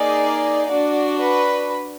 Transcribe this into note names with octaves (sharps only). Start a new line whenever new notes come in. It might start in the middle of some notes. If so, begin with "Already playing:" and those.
Already playing: A#3 D#4 G#4 D5
D4 F#4 D5
B4